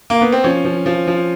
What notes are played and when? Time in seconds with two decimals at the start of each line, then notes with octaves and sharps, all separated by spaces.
0.10 A#3
0.21 B3
0.32 C4
0.44 F3 C#4
0.65 F3
0.86 F3
1.07 F3